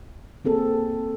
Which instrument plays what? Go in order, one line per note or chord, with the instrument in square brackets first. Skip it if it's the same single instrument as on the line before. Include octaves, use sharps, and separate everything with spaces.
[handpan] A#3 C4 G#4 A4